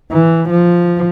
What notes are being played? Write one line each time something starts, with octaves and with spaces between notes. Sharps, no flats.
E3
F3